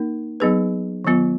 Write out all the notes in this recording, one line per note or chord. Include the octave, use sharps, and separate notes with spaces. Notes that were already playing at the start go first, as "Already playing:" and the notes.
Already playing: A#3 D#4 A#4
F#3 B3 D#4 G#4 B4
D#3 F#3 B3 F4